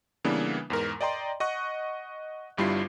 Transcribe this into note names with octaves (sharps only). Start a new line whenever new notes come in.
C#3 E3 G3 A#3 B3 D4
E2 G#2 A#4
D5 D#5 G5 A#5 C6
D#5 F#5 C#6 F#6
G1 G2 G3 E4 F4 C7